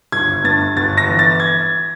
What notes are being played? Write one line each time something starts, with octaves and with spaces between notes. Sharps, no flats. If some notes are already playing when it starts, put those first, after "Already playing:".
G1 G#6
G2 A6
G1 A6
A#6
E3
A6
G#6